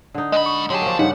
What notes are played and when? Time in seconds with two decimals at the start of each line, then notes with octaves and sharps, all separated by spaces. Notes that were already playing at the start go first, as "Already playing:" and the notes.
0.14 D3 D#4
0.32 G#3 D#5 B5
0.46 C#6
0.70 D3 F#3 G4 G#4 A5
0.82 F3 A#3
0.99 G2 C#3 D#4 F#5